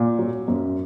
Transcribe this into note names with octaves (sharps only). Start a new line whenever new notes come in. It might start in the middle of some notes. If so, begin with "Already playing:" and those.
Already playing: A#2
F#3
F#2